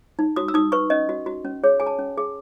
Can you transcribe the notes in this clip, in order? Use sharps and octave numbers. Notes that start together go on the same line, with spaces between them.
D#4
F#4 D#6
E6
D#4 D#6
B4 C#6
C#4 D#5
F#4
F#4
C#4
G#4 C#5
G#4 G#5
A5
C#4
G#4